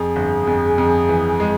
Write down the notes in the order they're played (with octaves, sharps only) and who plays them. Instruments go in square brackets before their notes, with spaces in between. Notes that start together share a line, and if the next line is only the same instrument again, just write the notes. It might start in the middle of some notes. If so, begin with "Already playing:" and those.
Already playing: [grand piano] F2 [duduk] G#4
[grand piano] G1
F2
F2
E3
G#3